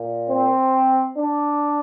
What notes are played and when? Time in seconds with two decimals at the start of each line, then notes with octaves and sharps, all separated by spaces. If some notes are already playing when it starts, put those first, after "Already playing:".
Already playing: A#2
0.28 C4
1.16 D4